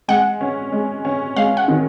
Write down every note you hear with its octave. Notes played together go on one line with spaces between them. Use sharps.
G#3 F#5
C#4
G#3
C#4
G#3 F5
F#5
D#3